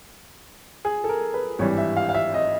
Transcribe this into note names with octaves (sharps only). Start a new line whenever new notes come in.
G#4
A4
A#4
B4
G#1 G2 E3 G3 C#5
E5
F5
F5
E5
D#5